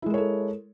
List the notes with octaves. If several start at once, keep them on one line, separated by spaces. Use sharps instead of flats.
G#3 E4 A4 A#4 C#5